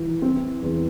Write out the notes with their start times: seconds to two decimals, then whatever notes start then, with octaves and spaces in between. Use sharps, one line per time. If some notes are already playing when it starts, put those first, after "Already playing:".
Already playing: E3
0.22 C4
0.62 E2